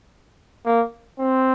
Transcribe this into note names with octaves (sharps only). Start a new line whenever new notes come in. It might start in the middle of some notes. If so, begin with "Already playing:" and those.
A#3
C4